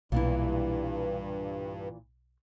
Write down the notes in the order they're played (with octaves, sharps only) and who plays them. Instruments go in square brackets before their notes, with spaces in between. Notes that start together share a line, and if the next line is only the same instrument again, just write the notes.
[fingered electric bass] B1 [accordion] G2 [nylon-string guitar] A#2 E3 E4